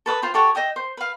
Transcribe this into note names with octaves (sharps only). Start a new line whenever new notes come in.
A4 B4 D6 D#6
F4 C5 G5
G4 A4 C#5 F#5
D#5 E5 G5 D#6
C5
B4 F5